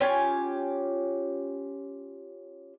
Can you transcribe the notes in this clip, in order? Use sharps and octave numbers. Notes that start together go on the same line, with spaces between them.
C#4 F4 G4 G#5